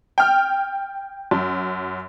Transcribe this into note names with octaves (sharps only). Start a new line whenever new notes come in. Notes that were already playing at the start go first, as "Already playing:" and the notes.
G5 F6
F#2